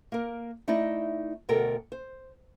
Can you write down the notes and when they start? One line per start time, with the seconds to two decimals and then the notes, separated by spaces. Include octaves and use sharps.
0.12 A#3 A#4
0.68 A3 D#4 E4 D5 D#5
1.49 D2 B2 A4 A#4 G5
1.92 C5